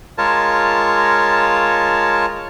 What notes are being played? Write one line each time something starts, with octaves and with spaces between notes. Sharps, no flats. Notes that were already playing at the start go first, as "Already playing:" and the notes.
G#3 F4 A#4 C#5 A5